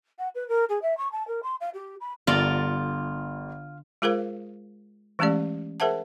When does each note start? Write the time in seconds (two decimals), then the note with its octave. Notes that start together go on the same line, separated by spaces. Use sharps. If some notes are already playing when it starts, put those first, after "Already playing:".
0.18 F#5
0.35 B4
0.48 A#4
0.69 G#4
0.82 E5
0.97 C#6
1.12 A5
1.28 A#4
1.43 C6
1.61 F5
1.74 G4
2.01 B5
2.27 G1 D3 F4 A#4 D5
4.02 G#3 F4 G#4 A#4 C5 F5
5.19 E3 G#3 A3 C#4 G4 D5
5.80 G#4 A#4 C5 E5 F#5 A5